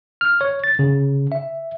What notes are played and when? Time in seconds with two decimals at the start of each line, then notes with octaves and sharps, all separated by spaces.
0.21 F6
0.41 C#5
0.64 A6
0.79 C#3
1.32 E5